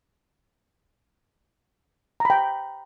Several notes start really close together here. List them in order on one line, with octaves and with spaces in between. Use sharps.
A#5 B5 G5